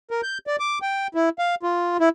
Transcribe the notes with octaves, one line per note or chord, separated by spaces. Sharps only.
A#4
G6
D5
D6
G5
E4
F5
F4
E4